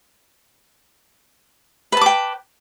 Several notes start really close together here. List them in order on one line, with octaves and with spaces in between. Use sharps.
B4 A5 D6 G5